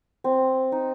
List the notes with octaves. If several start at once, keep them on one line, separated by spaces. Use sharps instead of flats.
C4
D#4